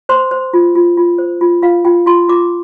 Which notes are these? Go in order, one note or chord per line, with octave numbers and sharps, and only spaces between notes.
C5 C6
C5
F4
F4
F4
C5
F4
F4 F5
F4 G5
F4 C6
F4 D6